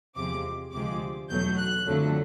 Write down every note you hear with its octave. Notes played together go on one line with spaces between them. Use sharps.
E2 C3 F3 G#3 D6
D2 C3 F3 G#3 D6
E2 B2 F#3 A3 G6
F#6
F2 D3 F#3 A3